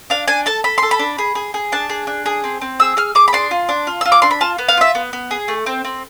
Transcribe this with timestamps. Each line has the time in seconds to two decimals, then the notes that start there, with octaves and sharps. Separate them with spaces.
0.10 D4 F5
0.28 D4 G#5
0.46 A4 A5
0.64 A4 B5
0.78 A4 C6
0.91 B5
0.99 D4
1.19 G#4
1.35 G#4
1.54 G#4
1.72 D4 A5
1.90 G#4
2.07 D4
2.26 G#4
2.44 C4
2.61 C4
2.80 G#4 E6
2.97 G#4 F6
3.15 G#4 D6
3.28 B5
3.33 D4 C6
3.51 F4
3.69 D4
3.87 F4
4.01 F4 E6
4.12 D6
4.22 D4 C6
4.31 B5
4.41 F4 A5
4.58 B3
4.69 F5
4.77 F4 E5
4.95 B3
5.13 B3
5.31 G#4
5.48 A3
5.66 C4
5.85 C4